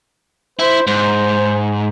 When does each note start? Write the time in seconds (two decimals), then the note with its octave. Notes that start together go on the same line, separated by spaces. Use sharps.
0.59 E4 C5
0.87 G#2 C5